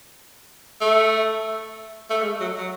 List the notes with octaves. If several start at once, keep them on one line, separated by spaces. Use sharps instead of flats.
A3
A3
G#3
F#3
F#3